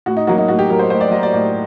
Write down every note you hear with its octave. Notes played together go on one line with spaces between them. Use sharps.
A2 F#4
D#4
F#3 A#3 F#4
D#4
A2 F#4
G4
F#3 A#3 A#4
C5
A2 C5
D5
F#3 A#3 D#5
D5
A2 D5